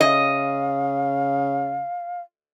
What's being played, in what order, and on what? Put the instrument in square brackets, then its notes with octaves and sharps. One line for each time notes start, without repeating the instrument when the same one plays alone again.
[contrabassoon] C#3 [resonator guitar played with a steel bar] D#5 [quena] F5